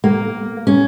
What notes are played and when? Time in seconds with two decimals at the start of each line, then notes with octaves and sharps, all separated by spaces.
0.04 A#3
0.67 C#4